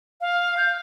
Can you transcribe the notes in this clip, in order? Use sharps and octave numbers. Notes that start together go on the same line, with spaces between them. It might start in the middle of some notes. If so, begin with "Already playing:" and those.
F5
G6